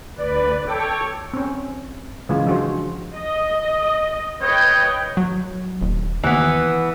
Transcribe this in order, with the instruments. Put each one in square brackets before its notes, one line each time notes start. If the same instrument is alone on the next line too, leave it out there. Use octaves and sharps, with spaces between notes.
[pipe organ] D2 B4 [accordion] D5
[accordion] A4 G5 D6 [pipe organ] C#5
[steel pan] C4 C#4
C#3 E3 G#3 F4
F3 D4 F#4 G#4 C5
[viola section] D#5
[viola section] B4 D#5 G5 [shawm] C#5
[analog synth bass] F#3
D#1
[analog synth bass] D#2 [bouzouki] E3 B3